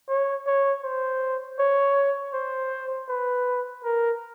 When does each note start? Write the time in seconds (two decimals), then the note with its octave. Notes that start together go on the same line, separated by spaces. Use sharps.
0.09 C#5
0.47 C#5
0.83 C5
1.59 C#5
2.34 C5
3.09 B4
3.84 A#4